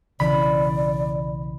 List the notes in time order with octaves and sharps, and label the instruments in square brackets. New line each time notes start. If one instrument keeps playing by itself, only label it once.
[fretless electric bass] B1 C#3 E3 [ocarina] D5 [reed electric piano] B5